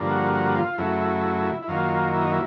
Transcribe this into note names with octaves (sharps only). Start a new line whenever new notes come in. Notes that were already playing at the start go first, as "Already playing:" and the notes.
Already playing: G2 D3 F3 A#3
F#4
F#4
F4
F#2 C#3 F#3 A3 E4
E4
F#2 D#3 F#3 A#3 F4
E4
D#4
E4